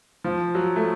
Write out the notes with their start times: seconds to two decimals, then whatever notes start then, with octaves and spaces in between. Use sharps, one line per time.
0.24 F3
0.55 F#3
0.76 A3